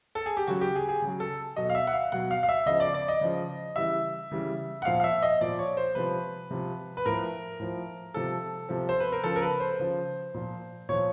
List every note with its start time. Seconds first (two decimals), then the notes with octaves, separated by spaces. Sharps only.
0.15 A4
0.26 G#4
0.37 G4
0.47 C#3 F#3 F#4
0.61 G4
0.75 G#4
0.89 G#4
1.02 C#3 F#3
1.20 A4
1.56 B2 F#3 D#5
1.70 F5
1.75 E5
1.87 F#5
1.93 F5
2.12 B2 F#3 F#5
2.31 F5
2.43 F5
2.49 E5
2.66 C#3 F3 D#5
2.80 D5
2.94 D5
3.08 D#5
3.21 C#3 F3
3.76 C#3 E3 G3 E5
4.31 C#3 E3 G3
4.82 F#5
4.85 A#2 F3 F5
5.00 F5
5.04 E5
5.23 D#5
5.41 A#2 F3 D5
5.59 C#5
5.77 C5
5.95 C3 F3 B4
6.51 C3 F3
6.97 B4
7.06 A2 F3 A#4
7.60 A2 F3
8.14 C3 F3 A4
8.69 C3 F3
8.89 C5
9.00 B4
9.12 A#4
9.24 C#3 F3 A4
9.36 A#4
9.42 B4
9.60 C5
9.80 C#3 F3
10.34 A#2 F3
10.89 A#2 F3 C#5